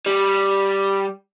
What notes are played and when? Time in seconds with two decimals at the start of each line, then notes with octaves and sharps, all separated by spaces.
0.06 G3